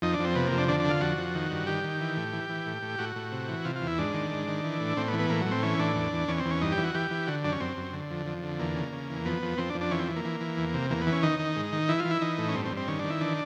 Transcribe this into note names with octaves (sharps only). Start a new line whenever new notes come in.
F2 D#4
D4
F2 C4
C3 B3
F2 A#3
D4
D3 D4
D3 D4
F4
F2 F#4
F2
D#3
G2
D#3 G4
D#3
E3
A2
E3
E3
A2
A2
A2 F#4
A2
C3
E3
C3 F4
F4
E2
E4
G#2 D4
D#3
G#2
D#3
E3
A2
A2 C4
B3
E3
B3
A2 A#3
A2 F#3
C4
E3 C#4
A2 D4
E2
E2
E2 C#4
C4
E2
C#4
G2 D#4
G4
E3
F#4
E3 G4
E3
D3 F#4
F#2 D4
C#4
F#2 C4
F#2
D3
F2
F2
D3
E2 A#3
C#3
C#3
E2
F2 B3
F2
F2 C4
D4
F2
D4
E3 C#4
C4
E3
A#3
E3
E3
E2
C3
E2 A#3
B3
E3
C#4
D#3 D#4
D#3
G#2
D#3
E3 E4
F4
E3
E4
E3 D#4
A2
C#4
G2 C4
C4
G2
C4
D#3 C#4
D#3 D4
E4
E3 D4